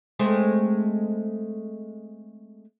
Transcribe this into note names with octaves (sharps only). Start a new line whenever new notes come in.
G#3 A3 C4